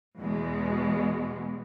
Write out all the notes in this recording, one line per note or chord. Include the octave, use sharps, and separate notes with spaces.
E2 B2 G#3